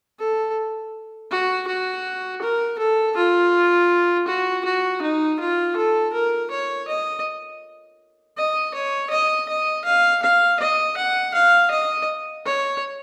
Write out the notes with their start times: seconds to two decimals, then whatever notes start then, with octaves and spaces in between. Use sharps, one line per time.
0.19 A4
1.31 F#4
1.67 F#4
2.42 A#4
2.78 A4
3.16 F4
4.27 F#4
4.65 F#4
5.02 D#4
5.40 F4
5.76 A4
6.13 A#4
6.51 C#5
6.88 D#5
8.37 D#5
8.74 C#5
9.10 D#5
9.49 D#5
9.85 F5
10.22 F5
10.60 D#5
10.97 F#5
11.34 F5
11.71 D#5
12.46 C#5